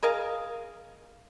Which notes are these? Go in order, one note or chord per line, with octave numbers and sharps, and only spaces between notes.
G#4 A#4 D#5 F5